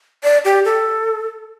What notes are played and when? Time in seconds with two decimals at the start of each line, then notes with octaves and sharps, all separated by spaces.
0.23 D5
0.45 G4
0.65 A4